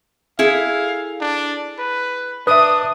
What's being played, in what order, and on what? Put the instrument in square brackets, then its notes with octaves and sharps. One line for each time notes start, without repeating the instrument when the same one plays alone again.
[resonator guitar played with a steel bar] E4 G#4 A4 [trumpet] F5
[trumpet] D4
B4
[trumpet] D4 [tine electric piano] B4 E5 [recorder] D#6